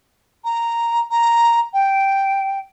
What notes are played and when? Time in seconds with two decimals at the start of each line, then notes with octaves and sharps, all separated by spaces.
0.44 A#5
1.11 A#5
1.73 G5